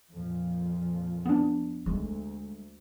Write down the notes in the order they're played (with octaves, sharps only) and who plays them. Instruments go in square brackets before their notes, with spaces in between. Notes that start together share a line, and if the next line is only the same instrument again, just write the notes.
[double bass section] F2 A#2 F3
[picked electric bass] B3 D4
[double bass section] D2 [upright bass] G#3